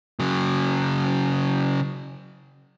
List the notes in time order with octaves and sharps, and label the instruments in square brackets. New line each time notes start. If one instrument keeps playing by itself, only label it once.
[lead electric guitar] C#3 F#3